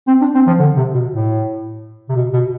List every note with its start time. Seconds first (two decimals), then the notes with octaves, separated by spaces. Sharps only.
0.08 C4
0.21 D4
0.35 C4
0.47 F3
0.59 D3
0.77 C3
0.94 B2
1.12 A2
2.09 C3
2.16 B2
2.33 B2